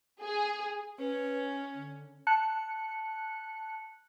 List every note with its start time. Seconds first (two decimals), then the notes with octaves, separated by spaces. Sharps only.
0.23 G#4
0.99 C#4 B4
1.74 D3
2.27 A5 F#6 C#7